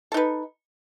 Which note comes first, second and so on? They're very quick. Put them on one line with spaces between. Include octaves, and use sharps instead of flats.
A4 D#4 B4